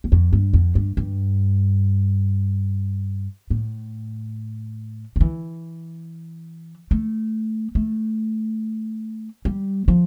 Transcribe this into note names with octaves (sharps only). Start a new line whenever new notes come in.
E2
F2
G2
F2
G2
G2
A2
F3
E3
A3
A3
G3
F3